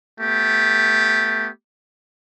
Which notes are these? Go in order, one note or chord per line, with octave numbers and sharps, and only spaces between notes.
A3 B3 G4